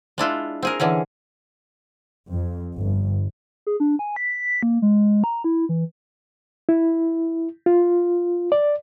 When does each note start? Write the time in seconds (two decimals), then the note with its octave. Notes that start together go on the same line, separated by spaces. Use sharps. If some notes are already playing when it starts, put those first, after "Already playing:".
0.18 G#3 D4 E4 F4
0.63 C4 G#4 A#4
0.80 D3 E3 C#4 G#4
2.32 F2
2.76 G1
3.67 G#4
3.80 D4
3.99 G#5
4.16 B6
4.63 A#3
4.82 G#3
5.24 A#5
5.44 E4
5.69 E3
6.69 E4
7.66 F4
8.52 D5